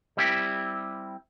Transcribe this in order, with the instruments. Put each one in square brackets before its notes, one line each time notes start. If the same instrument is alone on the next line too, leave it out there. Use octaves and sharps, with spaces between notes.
[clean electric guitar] G3 C4 E4 G4